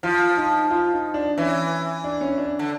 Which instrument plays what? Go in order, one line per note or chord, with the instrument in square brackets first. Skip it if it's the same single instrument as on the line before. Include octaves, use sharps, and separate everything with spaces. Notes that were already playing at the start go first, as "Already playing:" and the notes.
[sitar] F3 [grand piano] F4
[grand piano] D#4
F4
D#4
D4
[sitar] E3 [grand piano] C#4
[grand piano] D4
C#4
D4
[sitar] D3